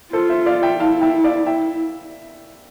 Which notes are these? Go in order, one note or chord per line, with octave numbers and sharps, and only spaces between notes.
F4 A4 C5
C5 E5
D5 F5
E5 G5
E4 F5 A5
E5 G5
D5 F5
E4 E5 G5